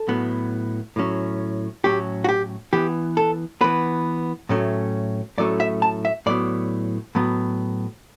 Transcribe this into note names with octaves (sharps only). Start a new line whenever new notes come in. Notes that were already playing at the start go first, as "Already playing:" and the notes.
Already playing: A4
A2 F#3 B3
A2 F#3 C#4
A2 F#3 C#4 G4
F#4
G4
E3 B3 G4
A4
E3 B3 B4
A2 F#3 A3 C#4
A2 F#3 A3 C#4 D5
E5
A5
E5
A2 F#3 B3 D5
A2 F#3 B3